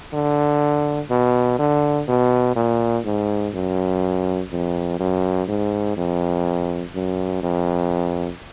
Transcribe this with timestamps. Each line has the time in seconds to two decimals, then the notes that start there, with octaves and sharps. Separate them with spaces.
0.13 D3
1.10 B2
1.59 D3
2.08 B2
2.56 A#2
3.05 G#2
3.54 F#2
4.52 F2
5.00 F#2
5.49 G#2
5.97 F2
6.95 F#2
7.43 F2